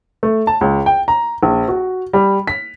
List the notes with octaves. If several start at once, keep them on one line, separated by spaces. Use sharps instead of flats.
A3
A5
C#2
G5
A#5
A#1
F#4
G3
B6